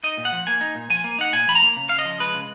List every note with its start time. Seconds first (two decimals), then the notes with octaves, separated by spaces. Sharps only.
0.03 D#4 D#5
0.17 A#2
0.25 F#5
0.32 F3
0.47 A#3 G#5
0.61 D#4
0.75 A#2
0.90 F3 G#5
1.04 A#3
1.19 D#4 F#5
1.33 A#2 G#5
1.48 F3 B5
1.55 A#5
1.62 A#3
1.76 C#3
1.89 C#3 F5
1.99 D#5
2.05 F3
2.20 G#3 B4
2.34 C#3